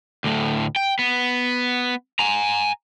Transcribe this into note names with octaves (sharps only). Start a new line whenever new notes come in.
D2 A2
G5
B3
G#5 A#5